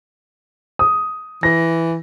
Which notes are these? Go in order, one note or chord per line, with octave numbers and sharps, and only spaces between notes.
D#6
E3 A#6